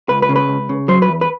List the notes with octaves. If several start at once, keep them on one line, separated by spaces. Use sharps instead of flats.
C#2 B4
B4
C#3
B4
C#2
C#3
F#3 C5
B4
E2
B4